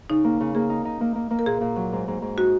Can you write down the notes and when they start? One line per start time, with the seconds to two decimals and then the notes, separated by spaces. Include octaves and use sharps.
0.10 C#3 D#4
0.24 A#3
0.40 C#3
0.55 A#3 G#4
0.70 D#4
0.85 D#4
1.01 A#3
1.15 A#3
1.31 A#3
1.39 A#4
1.46 A#2 G#4
1.61 A#2
1.76 F#3
1.93 G#2
2.08 G#2
2.22 G#2
2.38 D#4 F#4